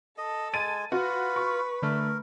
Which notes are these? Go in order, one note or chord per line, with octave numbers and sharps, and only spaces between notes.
A4 D#5
G#3 G#5 A6 D#7
F4 F#4 B4
C#6
D3 A3 A#4